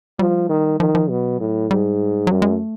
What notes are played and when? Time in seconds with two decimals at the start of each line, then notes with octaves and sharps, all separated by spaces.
0.19 F3 G3
0.49 D#3
0.80 D#3 F3
0.95 F3
1.09 B2 F#3
1.40 A2
1.71 G#2 G3
2.27 F#3
2.31 F#2 G3
2.42 G#3
2.51 A3